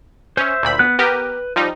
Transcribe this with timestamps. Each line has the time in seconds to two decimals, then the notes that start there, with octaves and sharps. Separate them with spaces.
0.37 C#4 C5 E5
0.63 D2 A#2 B5
0.79 B3 F#6
0.99 B3 G4 A#4 B4
1.56 F3 G3 D#4